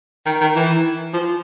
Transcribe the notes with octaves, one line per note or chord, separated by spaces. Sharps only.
D#3
D#3
E3
F3